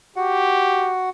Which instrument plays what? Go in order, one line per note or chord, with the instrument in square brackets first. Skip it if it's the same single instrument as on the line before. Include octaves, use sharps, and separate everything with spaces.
[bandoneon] F#4 F#5 [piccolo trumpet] G4